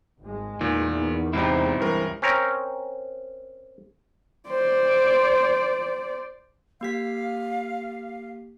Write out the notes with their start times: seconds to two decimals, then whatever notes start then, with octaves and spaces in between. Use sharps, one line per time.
0.21 G#1 G#3
0.61 E2 A#2 D#3
1.33 G#2 C3 C4 D#4 E4
1.80 C#2 G2 E3 A#4
2.22 C4 C#4 A#4 A#5
4.48 C5 D5
6.81 A#3 G4 F5 B6